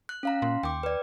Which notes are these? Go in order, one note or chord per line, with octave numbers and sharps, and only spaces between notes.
F#6
C#4 F5 A#5
A#2 C6
D#2 G5 D6
B4 D5